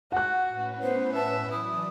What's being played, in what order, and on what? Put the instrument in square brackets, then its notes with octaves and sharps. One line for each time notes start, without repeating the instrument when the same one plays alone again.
[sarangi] F#4 [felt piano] F#5 F#6
[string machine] A2 C#4 B4
[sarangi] B3 [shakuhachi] C5
[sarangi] E5 [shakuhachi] A5
[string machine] E3 F#3 D5 [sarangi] E4 [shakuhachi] D#6